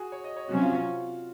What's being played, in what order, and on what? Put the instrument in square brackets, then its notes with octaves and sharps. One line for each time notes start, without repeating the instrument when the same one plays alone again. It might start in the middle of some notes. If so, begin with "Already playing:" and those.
Already playing: [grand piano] F#4 G#4
C#5
D#5
C#5
[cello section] C3 F#3 C#4 [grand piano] F#4
[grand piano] F4